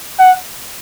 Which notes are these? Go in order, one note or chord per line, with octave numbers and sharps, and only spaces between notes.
F#5